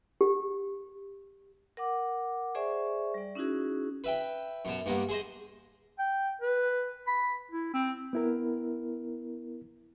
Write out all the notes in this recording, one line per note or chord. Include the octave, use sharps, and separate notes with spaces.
G4
A#4 F#5 D6
G#4 C5 D5 E5 G#5 C#6
G3 D5
C#4 D#4 E4 F#4 G#4
B4 E5 G5
F#2 B2
G2 A#3 B3
G#4 C5 D#5
G5
B4
B5
E4
C4
B3 E4 A#4